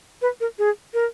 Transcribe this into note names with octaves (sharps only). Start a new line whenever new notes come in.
B4
A#4
G#4
A#4